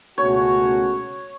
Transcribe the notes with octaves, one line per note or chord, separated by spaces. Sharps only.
C#2 B2 A3 C#4 F#4 C#5